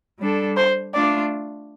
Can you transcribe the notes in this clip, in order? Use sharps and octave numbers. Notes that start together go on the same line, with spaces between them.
G3 D4 A4
C5
A3 D4 F4 D5